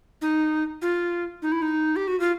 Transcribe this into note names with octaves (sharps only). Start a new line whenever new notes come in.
D#4
F4
D#4
E4
D#4
G4
F#4
F4